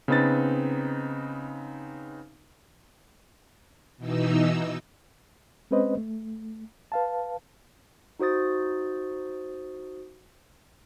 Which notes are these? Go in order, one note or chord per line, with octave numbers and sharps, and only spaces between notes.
C#3 B3 C4 D#4 B4 A6
B2 E3 D#4 E6
G#3 C4 C#4 B4 C5 D#5
A3
B4 F5 A5
D#4 F#4 C5 D#6 A6